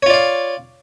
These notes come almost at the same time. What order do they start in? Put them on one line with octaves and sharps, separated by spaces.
C#5 F4 D5 F5